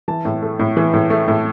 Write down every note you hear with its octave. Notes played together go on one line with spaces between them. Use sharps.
E3 A5
A2
A3
A2
E3
A2
A3
A2